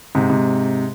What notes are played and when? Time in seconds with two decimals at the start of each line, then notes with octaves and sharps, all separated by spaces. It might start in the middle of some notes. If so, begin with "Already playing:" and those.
0.15 G#2 C3
0.30 G#2 C3